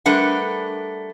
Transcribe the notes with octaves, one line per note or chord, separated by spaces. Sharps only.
G3 A3 D4 A#4 B4 F#5